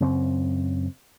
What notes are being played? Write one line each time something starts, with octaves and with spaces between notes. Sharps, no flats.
F#2 C#3 C4